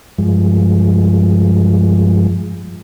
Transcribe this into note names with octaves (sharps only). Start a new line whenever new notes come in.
G2 F3 G#3